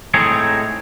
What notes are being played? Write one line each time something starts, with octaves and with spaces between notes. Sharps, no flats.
A2 G#3 C4 D#4 G#4 C#5